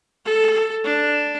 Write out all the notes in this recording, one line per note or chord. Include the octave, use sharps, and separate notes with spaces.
A4
D4